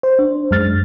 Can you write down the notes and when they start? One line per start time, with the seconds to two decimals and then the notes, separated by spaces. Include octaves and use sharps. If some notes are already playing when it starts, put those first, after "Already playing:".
0.03 C5
0.19 D4
0.51 F#2 G#3 F6 A6